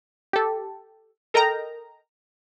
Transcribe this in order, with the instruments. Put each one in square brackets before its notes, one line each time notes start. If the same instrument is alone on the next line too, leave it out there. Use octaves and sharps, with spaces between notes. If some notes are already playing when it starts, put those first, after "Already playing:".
[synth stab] G4 A4
A4 A#4 D#5 G5 A#5